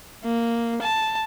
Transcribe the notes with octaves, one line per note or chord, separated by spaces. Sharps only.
A#3
A5